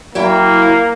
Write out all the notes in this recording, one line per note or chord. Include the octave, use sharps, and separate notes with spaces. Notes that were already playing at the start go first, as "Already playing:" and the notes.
F#3 A#3 E4 G5